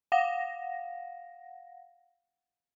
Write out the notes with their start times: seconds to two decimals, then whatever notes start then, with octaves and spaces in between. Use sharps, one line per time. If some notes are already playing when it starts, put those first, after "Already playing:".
0.12 F5 F#5 A#6